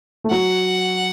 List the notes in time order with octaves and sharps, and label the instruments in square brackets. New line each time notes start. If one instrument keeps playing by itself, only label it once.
[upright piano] A3
[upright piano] F#3 [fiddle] F#5